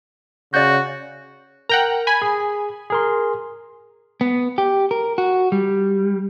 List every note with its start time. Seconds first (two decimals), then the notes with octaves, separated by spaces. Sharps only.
0.54 C#3 F#4 D5 G6
1.69 A#4 F#5 G5 A#5
2.07 G#5 B5
2.22 G#4
2.90 G#4 A#4 C6
4.21 B3
4.58 G4
4.91 A#4
5.18 F#4
5.52 G3